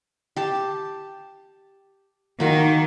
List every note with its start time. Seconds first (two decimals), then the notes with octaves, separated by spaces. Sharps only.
0.36 G4 A5
2.40 D#3 A#3 F#4